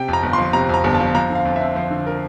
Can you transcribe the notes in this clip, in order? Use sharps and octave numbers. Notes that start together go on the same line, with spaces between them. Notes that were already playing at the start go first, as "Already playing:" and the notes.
Already playing: C3 G5
F2
A#5
G1
F3 C6
C3 A#5
F2 A#5
G1
A5
F3
F3 A#5
D3
F5
F2
C4 E5
F3 C5
D3
A#4